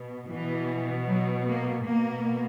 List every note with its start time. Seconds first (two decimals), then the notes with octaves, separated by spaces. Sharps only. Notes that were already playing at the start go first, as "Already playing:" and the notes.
Already playing: B2
0.29 B2 E3
1.07 F#3
1.46 A#3
1.84 B2 A#3